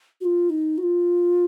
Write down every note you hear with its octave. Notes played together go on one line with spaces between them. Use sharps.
F#4
F4
D#4
F#4
F4